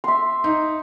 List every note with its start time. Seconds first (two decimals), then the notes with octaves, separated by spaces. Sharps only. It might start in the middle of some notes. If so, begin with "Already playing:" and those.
0.04 E5 C6
0.44 D#4